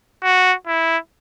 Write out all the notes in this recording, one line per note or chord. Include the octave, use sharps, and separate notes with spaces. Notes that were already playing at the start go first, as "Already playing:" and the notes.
F#4
E4